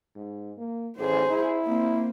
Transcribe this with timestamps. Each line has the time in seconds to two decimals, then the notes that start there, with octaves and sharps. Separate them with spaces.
0.16 G#2
0.58 A#3
0.98 A1 G#4 C5
1.30 E4
1.65 A#3 C4